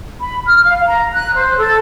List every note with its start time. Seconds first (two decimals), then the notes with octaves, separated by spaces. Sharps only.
0.20 B5
0.46 F6
0.65 F5
0.86 A#5
1.12 F#6
1.35 C5
1.57 A4